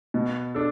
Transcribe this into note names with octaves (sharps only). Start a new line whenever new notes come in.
B2
D4 A4